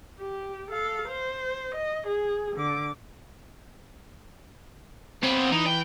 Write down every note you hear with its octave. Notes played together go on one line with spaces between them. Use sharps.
G4
A4 F5
C5
D#5
G#4
D3 D6
C#3 B3 C4
E3 D#4
G5